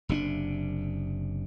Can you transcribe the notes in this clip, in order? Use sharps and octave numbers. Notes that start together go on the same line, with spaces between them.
F#1 C3 C#4 D4